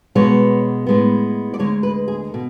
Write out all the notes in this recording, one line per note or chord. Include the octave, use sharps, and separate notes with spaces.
B2 G#3 B3 C#5
A2 G#3 B3
D5
D2 D3 G#3 C#5
B4
G#4
B2